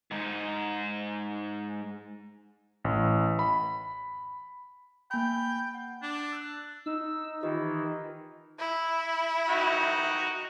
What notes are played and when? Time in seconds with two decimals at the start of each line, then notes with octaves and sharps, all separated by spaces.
0.11 G#2 D#4
2.84 A1
3.39 B5
5.11 A#3 G5 G#5 B5
5.74 F#5
6.02 D4
6.32 E6 F#6
6.86 D#4 E6
7.43 D#3 E3 F4 G4 D#5
8.59 E4
9.49 D#4 F#4 G5